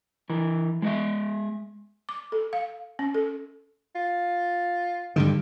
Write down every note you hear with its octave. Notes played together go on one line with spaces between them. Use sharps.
E3 A#4
G#3 F4 F#4 D#5 E5
D6
A4
F5
C#4
A4
F4
G2 D3 D#3